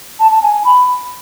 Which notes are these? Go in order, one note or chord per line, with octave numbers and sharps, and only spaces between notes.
A5
A5
G#5
G#5
B5